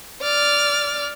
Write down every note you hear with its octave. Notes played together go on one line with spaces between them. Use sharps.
D5 F6